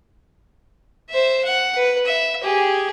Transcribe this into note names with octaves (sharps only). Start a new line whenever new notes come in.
C5 E5
F#5
B4
E5
G4 G#4